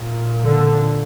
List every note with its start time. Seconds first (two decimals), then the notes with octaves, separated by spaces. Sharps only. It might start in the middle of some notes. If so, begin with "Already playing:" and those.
Already playing: A#2
0.44 D3